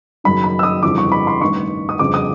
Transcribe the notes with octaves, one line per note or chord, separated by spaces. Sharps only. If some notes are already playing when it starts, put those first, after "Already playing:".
F#1 F#2 D#3 B5
B5
E6
D#6
G1 F2 C#3 E3 D6
C#6
B5
C6
A1 G2 D#3 C#6
D#6
G1 F2 C#3 D6
D#6